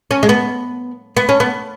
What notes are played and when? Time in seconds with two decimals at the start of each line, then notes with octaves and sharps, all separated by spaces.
0.11 C#4
0.23 G#3
0.29 B3
1.17 B3
1.29 C#4
1.40 B3